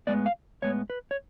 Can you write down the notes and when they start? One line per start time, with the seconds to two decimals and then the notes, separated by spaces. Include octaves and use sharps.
0.07 A2 G#3 B3 D5
0.26 F5
0.62 A2 G#3 B3 C#5
0.90 B4
1.11 C#5